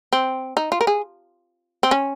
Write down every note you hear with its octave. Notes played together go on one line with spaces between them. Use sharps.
C4
D#4
F4
A#4
G#4
C4
C#4